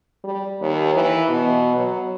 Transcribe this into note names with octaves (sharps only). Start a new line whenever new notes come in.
G3
D#2
E3
B2
F#3